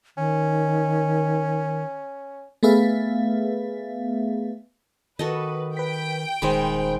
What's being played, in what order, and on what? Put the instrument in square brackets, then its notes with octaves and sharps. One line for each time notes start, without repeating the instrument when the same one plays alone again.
[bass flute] D#3 [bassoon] C#4
[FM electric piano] A3 B3 G#4 B4 E5 F5
[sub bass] D#3 [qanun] F#4 A4 D#5 [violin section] B4
[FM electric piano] B4 B6 [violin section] G5
[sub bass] D#1 [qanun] D#3 G#3 [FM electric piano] C5 B5